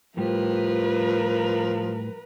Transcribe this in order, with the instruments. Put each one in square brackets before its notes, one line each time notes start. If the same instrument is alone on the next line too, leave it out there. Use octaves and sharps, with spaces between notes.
[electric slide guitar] A2 G3 G4 [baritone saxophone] F3 [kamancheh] A#4 B4